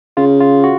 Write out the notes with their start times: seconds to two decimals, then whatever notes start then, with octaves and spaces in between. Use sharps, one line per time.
0.17 C#3 F4
0.41 F4
0.64 F#4